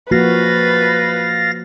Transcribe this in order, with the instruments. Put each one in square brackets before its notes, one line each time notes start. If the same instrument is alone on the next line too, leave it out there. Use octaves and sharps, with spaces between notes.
[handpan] F3 A#3 F#4 [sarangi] B4 [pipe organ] F5 A6 A#6